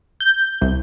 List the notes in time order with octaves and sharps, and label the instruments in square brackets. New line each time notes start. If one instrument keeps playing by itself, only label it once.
[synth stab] G6
C2